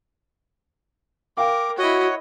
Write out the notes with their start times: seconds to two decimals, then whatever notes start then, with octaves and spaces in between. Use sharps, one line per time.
1.37 A#4 F5 G5 D6
1.78 E4 F#4 C#5 D#5 F#5